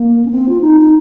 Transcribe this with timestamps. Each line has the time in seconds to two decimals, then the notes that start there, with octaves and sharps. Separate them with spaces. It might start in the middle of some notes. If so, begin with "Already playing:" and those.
Already playing: A#3
0.25 C#4
0.31 C4
0.49 F4
0.61 D#4
0.81 D#4